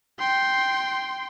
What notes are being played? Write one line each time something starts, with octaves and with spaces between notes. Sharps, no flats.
G5 C6